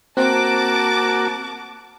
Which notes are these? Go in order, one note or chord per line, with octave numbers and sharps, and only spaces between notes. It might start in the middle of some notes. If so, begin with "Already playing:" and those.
A#3 C4 F#4 A5 D6